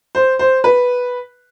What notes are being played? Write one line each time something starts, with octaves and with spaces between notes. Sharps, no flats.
C5
C5
B4